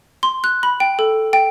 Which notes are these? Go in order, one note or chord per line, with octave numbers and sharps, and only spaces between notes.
C6
F#6
B5
G5
A4
G5